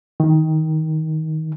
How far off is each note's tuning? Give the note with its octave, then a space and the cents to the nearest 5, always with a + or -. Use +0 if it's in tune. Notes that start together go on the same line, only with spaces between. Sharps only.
D#3 +15